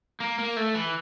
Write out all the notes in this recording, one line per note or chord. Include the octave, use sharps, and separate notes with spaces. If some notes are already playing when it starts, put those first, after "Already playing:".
A#3
A#3
A3
E3